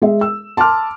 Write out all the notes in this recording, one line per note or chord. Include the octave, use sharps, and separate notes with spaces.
G#3 G#4 E5
E6
A5 C6 D6 F6